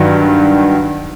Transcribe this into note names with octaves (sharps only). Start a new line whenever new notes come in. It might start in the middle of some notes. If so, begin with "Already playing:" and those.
Already playing: G2 D#3 F#3